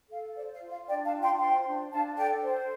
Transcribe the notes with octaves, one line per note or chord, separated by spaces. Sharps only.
A4 F5
C5 D5
F5
F4
F5
D4 D5 G5
F5 A5
F4
G5 C6
C5 G5 C6
D4
D4 F5 A5
A4 D5 G5
C5